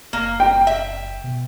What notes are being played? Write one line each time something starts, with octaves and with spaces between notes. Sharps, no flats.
F#1 A#3
G5
E5
B2